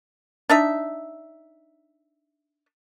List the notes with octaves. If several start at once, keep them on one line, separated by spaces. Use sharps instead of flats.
D4 D#4 E5